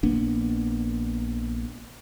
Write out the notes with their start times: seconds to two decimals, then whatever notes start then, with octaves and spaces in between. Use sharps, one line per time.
0.03 A#1 A#3 B3 D4